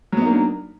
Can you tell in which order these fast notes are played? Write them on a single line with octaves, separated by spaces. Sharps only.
F#3 B3 D#4 A#3 D4